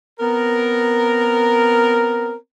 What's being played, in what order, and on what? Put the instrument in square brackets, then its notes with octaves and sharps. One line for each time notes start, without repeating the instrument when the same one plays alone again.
[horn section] B3 C4 A#4